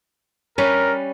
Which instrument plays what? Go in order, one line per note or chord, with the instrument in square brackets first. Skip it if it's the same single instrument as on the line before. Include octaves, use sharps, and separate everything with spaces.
[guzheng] G3 C#4 B4 [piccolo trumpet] A#4 [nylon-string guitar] C#5